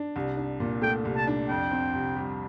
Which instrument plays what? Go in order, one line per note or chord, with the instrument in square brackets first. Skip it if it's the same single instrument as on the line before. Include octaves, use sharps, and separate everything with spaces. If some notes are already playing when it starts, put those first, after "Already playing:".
Already playing: [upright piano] D4
C2
D4
A#2
[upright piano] A3 [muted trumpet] G5
[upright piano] C2
[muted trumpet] A5
[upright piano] D4
[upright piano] F2 [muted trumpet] G5
[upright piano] C4
C3
G3